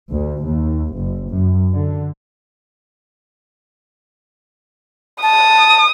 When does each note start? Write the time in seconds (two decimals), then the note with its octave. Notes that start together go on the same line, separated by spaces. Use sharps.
0.11 D2
0.46 D#2
0.95 F#1
1.32 F#2
1.73 D3
5.23 A5 D#6